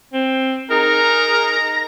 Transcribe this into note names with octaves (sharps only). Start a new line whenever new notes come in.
C4
D#4 G#4 A#4 A#5